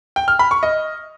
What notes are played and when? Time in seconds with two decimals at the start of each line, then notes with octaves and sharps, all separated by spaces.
0.16 G5
0.28 F6
0.39 B5
0.51 C#6
0.63 D#5